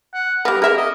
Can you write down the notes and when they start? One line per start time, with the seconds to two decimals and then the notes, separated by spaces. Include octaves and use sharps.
0.13 F#5
0.45 G3 B3 A#4
0.62 G#4 A#4 E5
0.77 D#5